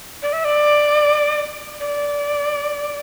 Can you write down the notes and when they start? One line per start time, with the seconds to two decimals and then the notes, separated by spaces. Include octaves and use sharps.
0.22 D5
0.33 E5
0.45 D5
1.80 D5